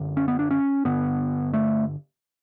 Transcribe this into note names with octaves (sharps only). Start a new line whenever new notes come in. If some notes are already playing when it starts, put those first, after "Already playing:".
Already playing: F#2 D3
C#4
B3
D4
C#4
G2 D3 B3
A3